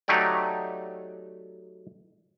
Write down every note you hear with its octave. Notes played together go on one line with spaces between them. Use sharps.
F#3 A3 D#4 G4 D5